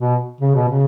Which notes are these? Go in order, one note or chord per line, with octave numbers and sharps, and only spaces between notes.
B2
C#3
B2
C#3